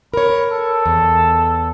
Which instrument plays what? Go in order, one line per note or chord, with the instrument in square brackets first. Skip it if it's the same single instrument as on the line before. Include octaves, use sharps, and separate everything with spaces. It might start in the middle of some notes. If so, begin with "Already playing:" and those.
[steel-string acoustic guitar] A#4 C#5 [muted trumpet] B5
[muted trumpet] A4
[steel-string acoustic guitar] E2